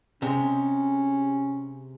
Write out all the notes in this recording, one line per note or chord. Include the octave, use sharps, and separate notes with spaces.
C3 G#3 C#4